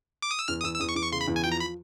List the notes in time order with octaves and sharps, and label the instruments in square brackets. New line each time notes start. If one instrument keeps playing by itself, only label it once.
[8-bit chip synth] D6
D#6
E6
[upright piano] E2 [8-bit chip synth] F6
[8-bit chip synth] D#6
[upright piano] E2 [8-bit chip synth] E6
[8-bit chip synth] E6
[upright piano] E2 [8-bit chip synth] D#6
[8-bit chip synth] C#6
[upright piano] E2 [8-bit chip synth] D6
[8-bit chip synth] C#6
[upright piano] C#3 [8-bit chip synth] C6
[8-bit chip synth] B5
[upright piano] E2
[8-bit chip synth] G#5
[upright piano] F3 [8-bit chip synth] G5
[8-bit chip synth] A#5
B5